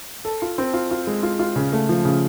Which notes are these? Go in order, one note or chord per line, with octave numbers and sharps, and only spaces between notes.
A4
F4
C4
F4
F4
G#3
F4
F4
C#3
A3
F3
C#3